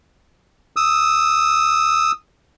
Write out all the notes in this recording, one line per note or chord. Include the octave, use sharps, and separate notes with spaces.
D#6 E6